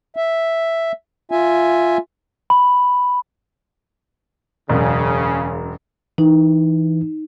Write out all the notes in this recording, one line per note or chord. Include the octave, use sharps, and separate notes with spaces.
E5
F4 E5 G#5
B5
E1 F#2 C#3
E3 D#4